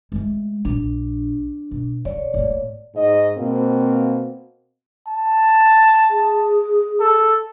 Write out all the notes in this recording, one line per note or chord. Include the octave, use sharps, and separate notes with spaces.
G#3 A3
A#1 D4
B2
C#3 C#5 D5
A2 A#3
G#2 D#5
B2 A#3 C4
A5
G#4
A4